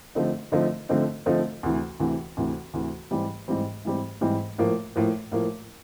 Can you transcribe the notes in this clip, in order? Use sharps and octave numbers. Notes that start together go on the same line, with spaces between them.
D3 F3 A3 C4 D#4
D3 F3 A3 C4 D#4
D3 F3 A3 C4 D#4
D3 F3 A3 C4 D#4
D2 C3 E3
D2 C3 E3
D2 C3 E3
D2 C3 E3
G#2 E3 G3 C4
G#2 E3 G3 C4
G#2 E3 G3 C4
G#2 E3 G3 C4
A2 F3 A#3
A2 F3 A#3
A2 F3 A#3